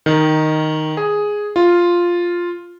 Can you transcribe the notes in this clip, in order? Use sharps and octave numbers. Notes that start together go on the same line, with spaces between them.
D#3
G#4
F4